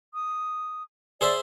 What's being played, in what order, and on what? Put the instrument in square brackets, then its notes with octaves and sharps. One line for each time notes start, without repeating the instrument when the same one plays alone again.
[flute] D#6
[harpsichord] G#4 C5 E5 [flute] D5